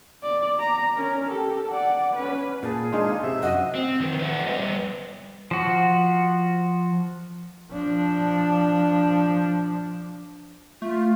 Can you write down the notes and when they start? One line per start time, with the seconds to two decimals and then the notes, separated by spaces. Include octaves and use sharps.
0.23 D5
0.60 A#5
0.97 C#4 A#4
1.28 G4 A4
1.70 D5 F#5
2.16 C#4 B4
2.63 A#2 G#4 A5
2.93 G#3 D4 D#4 F4
3.23 C3 E5
3.43 F#2 F#4 D#5
3.75 C4
4.00 D#3 E3
4.19 B4 C5 D#5 E5 F#5
4.47 G3 B3 D#5
5.51 F3 F#4
7.72 F3 D4
10.82 A3 F4